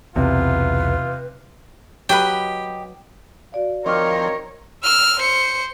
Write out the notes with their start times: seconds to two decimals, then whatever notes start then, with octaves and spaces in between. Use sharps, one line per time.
0.16 B1 E2 C3 F4 B4
2.09 F#3 G4 B4 D#5 G5 B5
3.52 F#4 D5 F5
3.86 D#3 F3 C4 A#4 C#5 C#6 D6 F6
4.83 E6 F6
5.19 C5 C#7